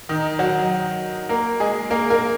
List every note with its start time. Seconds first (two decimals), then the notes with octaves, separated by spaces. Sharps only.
0.09 D#3 D#4
0.39 F#3 F#4
1.29 A#3 A#4
1.60 G#3 G#4
1.90 A#3 A#4
2.10 A#3 A#4